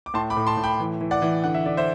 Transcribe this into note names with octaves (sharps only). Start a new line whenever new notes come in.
D6
A2 A5 C6
B5 D6
A2
A5 C6
A2
G5 B5
E3
E3
D5 F#5
E3
D3 F#5
E5
D3 D5
C5 E5